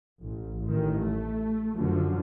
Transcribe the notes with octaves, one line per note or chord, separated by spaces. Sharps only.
A1
A1 D#3
A3
F#2 D3 F3